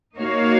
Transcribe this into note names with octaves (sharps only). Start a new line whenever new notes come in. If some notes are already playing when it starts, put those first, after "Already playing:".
A#3 D#4 F#4 C#5 F5